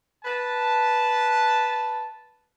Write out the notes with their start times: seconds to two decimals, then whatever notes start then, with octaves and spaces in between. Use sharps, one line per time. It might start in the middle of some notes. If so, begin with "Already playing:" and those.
0.24 B4 A5